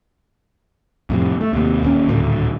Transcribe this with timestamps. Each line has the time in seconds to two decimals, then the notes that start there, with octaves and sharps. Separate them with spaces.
1.10 F2 A2 C3
1.41 A3
1.53 D#2 C3
1.83 E1 D#2 A2 C#4
2.08 D#1 D2 A2 D3